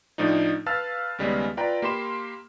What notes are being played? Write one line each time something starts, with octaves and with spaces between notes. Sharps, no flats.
A2 F3 D4 D#4
B4 F5 A5 E6 F6 A6
D#2 C#3 G3 G#3 B3
F4 B4 D5 G5 A#5
A#3 G4 B5 C6 E7